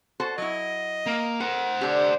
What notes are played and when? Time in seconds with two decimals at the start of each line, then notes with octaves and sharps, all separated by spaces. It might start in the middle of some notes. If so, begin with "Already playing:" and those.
0.20 F#4 A4 C5
0.38 F#3 E4 D#5
1.06 A#3
1.40 A#4 C5 F#5
1.81 D3 D4 G4